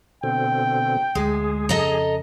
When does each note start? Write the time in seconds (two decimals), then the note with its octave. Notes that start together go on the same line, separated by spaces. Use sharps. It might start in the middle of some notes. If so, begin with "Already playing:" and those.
0.24 B2 D3 C4 G5
1.15 D2 G#3 G#4
1.69 F2 C#3 A4 D#5 A#5